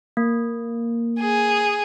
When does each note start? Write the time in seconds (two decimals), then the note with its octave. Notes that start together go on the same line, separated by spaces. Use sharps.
0.17 A#3
1.20 G#4